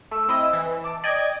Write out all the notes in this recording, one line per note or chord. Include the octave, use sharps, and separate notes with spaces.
A3 E6
C4 E4 D#5
E3
A5 D6
D5 D#5 G5 G#6